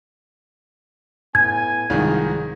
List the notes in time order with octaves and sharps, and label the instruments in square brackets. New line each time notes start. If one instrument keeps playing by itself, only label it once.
[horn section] A2 B3 G#5 [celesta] G#6
[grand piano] C2 G#2 D#3 [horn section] F3 G#4